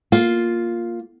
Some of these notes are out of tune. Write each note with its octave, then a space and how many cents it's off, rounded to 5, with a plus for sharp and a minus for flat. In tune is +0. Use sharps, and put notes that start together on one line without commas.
A#3 +0 F4 +0